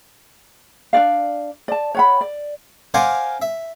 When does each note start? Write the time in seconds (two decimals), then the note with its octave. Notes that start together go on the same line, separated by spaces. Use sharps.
0.93 D4 F#4 D5 F5
1.68 D5 A5
1.95 C#5 F#5 B5
2.21 D5
2.94 A#4 C5 D5 F5 F#5 G#5
3.42 E5